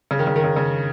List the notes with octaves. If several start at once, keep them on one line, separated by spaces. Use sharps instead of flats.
C#3
D#3
C#3
D#3
C#3
C#3